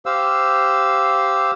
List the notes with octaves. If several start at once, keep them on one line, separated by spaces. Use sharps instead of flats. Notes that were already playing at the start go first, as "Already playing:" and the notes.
G4 C5 F5 E6